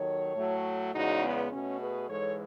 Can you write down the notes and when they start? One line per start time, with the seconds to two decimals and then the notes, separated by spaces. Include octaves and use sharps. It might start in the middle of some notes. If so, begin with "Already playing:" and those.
Already playing: D#2 D#3 F#3 A4 C#5
0.36 A2 F#3 A3
0.93 E2 C#3 G#3 D#4 F#4
1.23 B3
1.52 B2 A3 C#4
1.80 G#4 B4
2.09 G#2 E3 G#3 A4 C#5